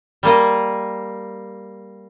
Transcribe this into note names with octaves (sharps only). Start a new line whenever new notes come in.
G3 A#3 D#5